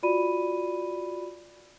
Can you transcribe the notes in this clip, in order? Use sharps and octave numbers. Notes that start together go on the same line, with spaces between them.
F4 F#4 D5 B5 D#7